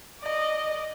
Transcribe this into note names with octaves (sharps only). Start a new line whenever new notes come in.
D5 D#5